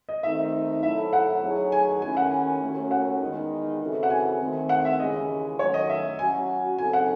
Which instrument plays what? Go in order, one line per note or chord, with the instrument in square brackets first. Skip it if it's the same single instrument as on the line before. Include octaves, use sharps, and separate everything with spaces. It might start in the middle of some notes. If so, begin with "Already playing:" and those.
[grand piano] D#5
[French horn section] D#3 A3 C4 D#4 [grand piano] E5
[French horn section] F#3 A3 C4 E4 A4 [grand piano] E5
[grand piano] F#5
[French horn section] F#3 A3 D#4 G#4 C#5
[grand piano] G#5
[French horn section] D#2 D#3 A3 C#4 E4 [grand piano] G#5
[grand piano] F#5
[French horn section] D#2 D#3 A3 C#4 F#4
[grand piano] F#5
[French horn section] E2 D#3 G#3 D#4
C#3 E3 C4 F#4 A4
[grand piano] F#5
G#5
[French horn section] D#2 D#3 A3 C4
[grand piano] F#5
E5
[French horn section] D#2 C#3 E3 G#3 C#4 [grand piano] D#5
[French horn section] D#3 F#3 A3 C#4 F#4 [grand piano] C#5
[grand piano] D#5
E5
[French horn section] F#3 C#4 F#4 [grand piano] G#5
[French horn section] C#3 F#3 C4 D#4 A4 [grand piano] G#5
[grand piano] F#5